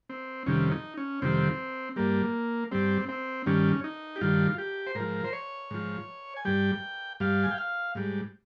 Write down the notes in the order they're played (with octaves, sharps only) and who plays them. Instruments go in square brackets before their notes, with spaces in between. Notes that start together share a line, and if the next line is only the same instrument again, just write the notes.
[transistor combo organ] C4
F2 C3 D#3 G3 C#4
D#4
C#4
F2 C3 D#3 G3 C4
G2 G3 A#3
G2 G3 C4
C4
G2 D#3 G3 C#4
D#4
G4
G2 D#3 G3 F4
G4
C5
G#2 F3 A#4
C5
C#5
G#2 F3
G#5
G2 G3 G5
G2 G3 F5
G#5
G5
F5
G#2 G3